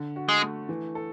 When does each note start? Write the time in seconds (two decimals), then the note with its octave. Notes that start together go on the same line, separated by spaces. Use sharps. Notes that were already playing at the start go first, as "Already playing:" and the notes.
Already playing: D3
0.16 F#4
0.29 G#3
0.42 A3
0.69 E3
0.95 A4